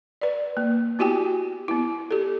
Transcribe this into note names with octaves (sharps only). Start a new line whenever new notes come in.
B4 D5
A#3
B3 E4 F#4 G4 G5 G#5
B3 E4
G4 A4